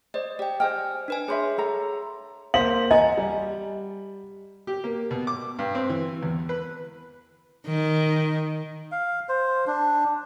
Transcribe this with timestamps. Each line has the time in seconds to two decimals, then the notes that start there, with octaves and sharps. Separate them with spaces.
0.14 C5 D5 D#5
0.39 G4 D5 G5
0.60 C5 D#5 G5 G#5 F6
1.08 D4 B4 G#5
1.28 G#4 B4 C#5 E5 C6
1.58 A4 A#5
2.54 A#3 C5 F5 F#7
2.91 D#5 F#5 G#5 A#5
3.17 G3
4.67 G4
4.84 A#3
5.11 B2
5.27 D6
5.59 G2
5.75 C4
5.90 E3
6.23 E2
6.49 B4
7.67 D#3
8.92 F5
9.29 C5
9.67 D4